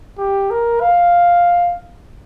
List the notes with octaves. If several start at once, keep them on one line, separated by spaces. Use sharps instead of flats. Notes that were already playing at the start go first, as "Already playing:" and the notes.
G4
A#4
F5